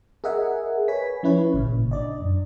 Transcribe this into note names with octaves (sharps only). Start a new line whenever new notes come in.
G#4 A#4 D#5 E5 F#5 G#5
B4 C#5 G#5 B6
F3 C#4 E4 B4 C#5
G#1 A#2 C#3
D4 D5 D#5
F#2